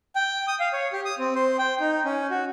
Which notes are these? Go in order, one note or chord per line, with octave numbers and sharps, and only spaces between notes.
G5
D#6
F5
C#5
G4
D#6
C4
C5
G5
D#4
C#4
F#4